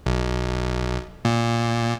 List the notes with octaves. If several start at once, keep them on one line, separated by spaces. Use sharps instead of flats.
B1
A#2